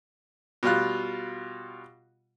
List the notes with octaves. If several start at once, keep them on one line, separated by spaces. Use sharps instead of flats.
B2 G3 F4 F#6